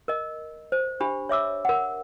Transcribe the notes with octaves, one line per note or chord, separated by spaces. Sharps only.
A#4 D#5
C5
D4 G4 B5
C#5 E5 D6 E6
A#4 F#5